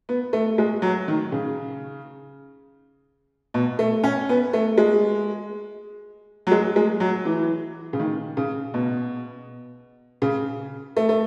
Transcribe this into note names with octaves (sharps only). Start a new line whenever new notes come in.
B3
A3
G#3
F#3
D#3
C#3
B2
A3
C#4
B3
A3
G#3
F#3
G#3
G#3
F#3
E3
C#3
D#3
C#3
B2
C#3
A3
A3